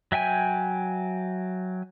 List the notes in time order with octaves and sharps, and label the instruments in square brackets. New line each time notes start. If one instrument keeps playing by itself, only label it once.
[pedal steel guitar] F#3 E5 G5 G#5